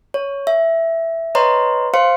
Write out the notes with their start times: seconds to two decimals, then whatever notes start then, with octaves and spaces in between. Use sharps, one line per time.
0.14 C#5
0.47 E5
1.35 B4 C#5 D#5 A#5 C6
1.94 C5 F5 C6 C#7